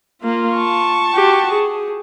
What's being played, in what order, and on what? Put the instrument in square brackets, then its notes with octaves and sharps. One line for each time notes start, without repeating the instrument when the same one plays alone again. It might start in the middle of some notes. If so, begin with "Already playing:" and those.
[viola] A#3 [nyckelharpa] F4
[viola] A5 C#6
[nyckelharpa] F#4 G4
G#4